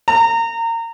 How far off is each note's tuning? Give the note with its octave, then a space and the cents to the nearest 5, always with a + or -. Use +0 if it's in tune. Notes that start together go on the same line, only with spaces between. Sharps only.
A#5 -30